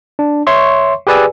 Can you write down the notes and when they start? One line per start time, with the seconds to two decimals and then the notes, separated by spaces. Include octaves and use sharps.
0.19 D4
0.47 C#5 E5 C6 C#6
1.07 G4 G#4 B4 D5 G#5 E6